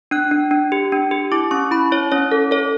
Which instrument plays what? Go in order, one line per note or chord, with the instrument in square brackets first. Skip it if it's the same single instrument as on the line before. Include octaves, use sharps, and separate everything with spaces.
[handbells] D4 F#6
D4
D4
G4
D4
G4
E4 D6
C#4 C#6
E4 B5
E4 C#5
C#4 C#5
A4
A4 C#5